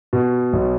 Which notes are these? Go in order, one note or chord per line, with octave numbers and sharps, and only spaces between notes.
B2
B1